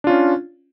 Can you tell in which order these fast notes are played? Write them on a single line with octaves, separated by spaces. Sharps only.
D4 F4 C#4